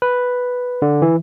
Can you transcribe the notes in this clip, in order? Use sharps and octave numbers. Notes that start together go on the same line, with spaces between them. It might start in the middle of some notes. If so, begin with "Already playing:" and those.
B4
D3
E3